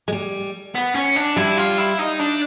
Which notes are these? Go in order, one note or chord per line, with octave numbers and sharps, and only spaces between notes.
G#3
G3
B3
C#4
D4
G3 E4
F4
E4
D#4
D4